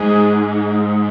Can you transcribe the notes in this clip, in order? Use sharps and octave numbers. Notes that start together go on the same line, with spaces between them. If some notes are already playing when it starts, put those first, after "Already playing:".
Already playing: G#2 G#4